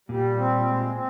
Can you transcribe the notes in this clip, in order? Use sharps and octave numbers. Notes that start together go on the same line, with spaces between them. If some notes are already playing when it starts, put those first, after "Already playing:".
A#2 G3
C4
G#3
C4